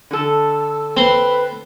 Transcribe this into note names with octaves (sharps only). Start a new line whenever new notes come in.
D3 A4
C4 B4 C6